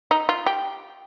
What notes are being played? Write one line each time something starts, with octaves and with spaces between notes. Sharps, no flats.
D#4
F4
G4